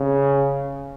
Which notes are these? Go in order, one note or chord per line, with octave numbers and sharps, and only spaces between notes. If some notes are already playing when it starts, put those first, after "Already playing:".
Already playing: C#3